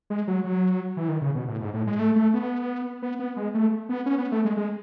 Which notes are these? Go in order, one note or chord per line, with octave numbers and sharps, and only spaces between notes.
G#3
F#3
F#3
E3
D#3
C#3
B2
A2
G#2
A2
G#3
A3
A3
B3
B3
B3
G#3
A3
B3
C#4
B3
A3
G#3
G#3